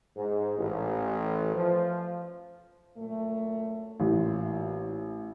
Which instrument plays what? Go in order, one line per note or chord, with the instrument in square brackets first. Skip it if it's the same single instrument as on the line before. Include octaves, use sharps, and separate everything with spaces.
[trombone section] G#2
A1
F3
[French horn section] F#2 A#2 A3
[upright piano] A1 [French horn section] A#2 E4 F4